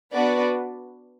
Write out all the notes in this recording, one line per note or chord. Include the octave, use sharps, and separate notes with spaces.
B3 D4 F#4 B4 D5